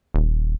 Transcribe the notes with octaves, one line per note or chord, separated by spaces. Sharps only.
D#1